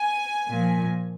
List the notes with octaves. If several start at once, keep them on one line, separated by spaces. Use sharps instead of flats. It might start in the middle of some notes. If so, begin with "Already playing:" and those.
Already playing: G#5
A#2 F3